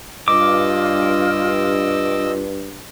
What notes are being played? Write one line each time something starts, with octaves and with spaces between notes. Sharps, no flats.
G2 F4 D#5 D6 E6